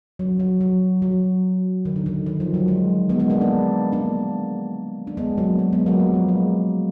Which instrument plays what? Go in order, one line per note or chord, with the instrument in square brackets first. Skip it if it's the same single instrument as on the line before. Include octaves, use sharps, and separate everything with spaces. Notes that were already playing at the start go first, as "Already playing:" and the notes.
[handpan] F#3
F#3
F#3
F#3
D#3
D3
D#3
D#3
F3
F#3
G#3
G#3 B3
G#3 B3
A#3 D4
A#3 D4
A#3 D4
D4
G#3 B3
F#3 A#3
G#3
G#3 B3
F#3 A#3
F#3
F3
G#3